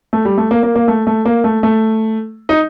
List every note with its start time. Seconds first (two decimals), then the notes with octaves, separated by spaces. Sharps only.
0.13 A3
0.25 G3
0.38 A3
0.51 A#3
0.63 A#3
0.75 A#3
0.88 A3
1.07 A3
1.25 A#3
1.44 A3
1.63 A3
2.49 D#4